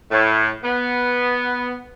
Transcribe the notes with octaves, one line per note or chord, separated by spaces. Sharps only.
A2
B3